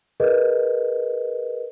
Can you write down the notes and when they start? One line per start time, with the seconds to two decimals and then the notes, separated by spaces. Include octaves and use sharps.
0.20 G#4 A#4 B4 D#5